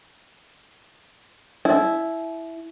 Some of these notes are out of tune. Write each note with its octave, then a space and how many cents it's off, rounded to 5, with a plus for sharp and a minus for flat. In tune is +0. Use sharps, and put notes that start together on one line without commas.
E4 +0 A5 -45